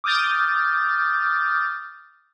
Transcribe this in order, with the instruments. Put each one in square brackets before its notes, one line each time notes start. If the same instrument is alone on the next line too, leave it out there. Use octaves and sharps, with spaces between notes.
[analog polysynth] D6 D#6 F6 G6 A6